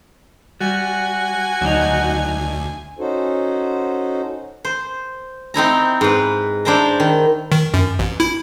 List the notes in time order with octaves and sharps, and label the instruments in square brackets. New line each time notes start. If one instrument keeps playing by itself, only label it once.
[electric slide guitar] G3 [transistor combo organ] F#4 [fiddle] G#5
[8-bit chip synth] D2 [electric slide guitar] F#3 D#4
[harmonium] C#4 D#4 F#4 A4 C5
[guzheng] C5
C4 D#4 E4 A#5
G#2 B4
D4 E4 C5 G5 A#5
D#3
[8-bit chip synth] D#3
F#2
A1
E4